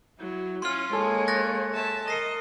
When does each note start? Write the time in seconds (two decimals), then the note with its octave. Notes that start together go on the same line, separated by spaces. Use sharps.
0.20 F#3 E4
0.62 C#4 F4 C6 F6
0.93 G#3 A#3 A4 C#5 G#5
1.28 F#6 A6 A#6
1.74 E5 A5
2.08 A#4 D#5 A#6 C7 C#7